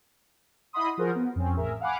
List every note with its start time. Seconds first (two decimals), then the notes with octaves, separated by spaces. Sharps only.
0.73 E4 D#5 F#5 B5 C6 D#6
0.97 F3 F4 F#4 G#4 A#4 C5
1.15 B3
1.35 F2 C4 C#4
1.57 A1 G#4 A#4 E5
1.81 F5 F#5 G#5 B5 D6